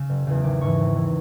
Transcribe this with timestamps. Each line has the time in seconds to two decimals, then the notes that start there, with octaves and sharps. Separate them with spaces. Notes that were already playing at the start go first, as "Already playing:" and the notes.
Already playing: C#3 E6
0.09 F#1
0.27 E2 C#3
0.44 G#1 D6
0.61 G#2 E3 C#6
0.80 G#1
0.97 E3